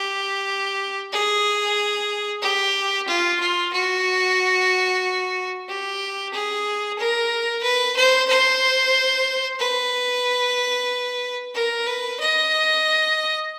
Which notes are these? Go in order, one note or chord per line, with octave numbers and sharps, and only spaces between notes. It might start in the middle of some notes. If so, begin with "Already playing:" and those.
Already playing: G4
G#4
G4
F4
F4
F#4
G4
G#4
A#4
B4
C5
C5
B4
A#4
B4
D#5